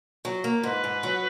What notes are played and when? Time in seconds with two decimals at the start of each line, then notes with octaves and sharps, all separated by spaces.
0.25 F#3
0.44 A#3
0.63 G#2 B4
0.84 G#2
1.03 F#3